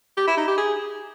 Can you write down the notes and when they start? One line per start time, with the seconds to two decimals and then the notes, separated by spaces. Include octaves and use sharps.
0.17 G4
0.27 E4
0.37 D#4
0.48 G4
0.58 G#4